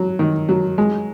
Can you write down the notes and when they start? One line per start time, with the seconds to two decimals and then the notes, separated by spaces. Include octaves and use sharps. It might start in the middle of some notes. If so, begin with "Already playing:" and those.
Already playing: F#3
0.19 D#3
0.49 F#3
0.78 G#3